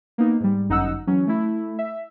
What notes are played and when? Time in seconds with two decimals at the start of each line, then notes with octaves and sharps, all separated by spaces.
0.18 A#3 B3 D#4
0.40 G#2 G3
0.69 G1 F#2 D#4 F#5 E6
1.07 E3 F#3 C#4
1.27 A3 E4
1.79 E5